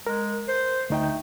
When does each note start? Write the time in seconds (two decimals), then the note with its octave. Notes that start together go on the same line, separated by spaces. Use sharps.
0.07 G#3 A#4
0.48 C5
0.90 D2 A3 D#4 G5